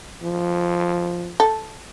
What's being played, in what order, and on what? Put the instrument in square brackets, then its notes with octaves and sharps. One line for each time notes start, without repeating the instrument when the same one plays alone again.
[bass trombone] F3
[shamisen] A4